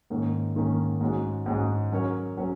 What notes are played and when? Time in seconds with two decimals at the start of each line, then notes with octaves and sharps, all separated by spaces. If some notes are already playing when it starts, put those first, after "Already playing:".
0.10 G#2 D#3 A#3 C#4
0.56 G#2 D#3 A#3 C#4
1.01 G#2 G#3 C#4 F#4
1.46 G#2 G#3 C#4 F#4
1.92 F#3 C#4 A#4 C#5
2.37 F#3 C#4 A#4 C#5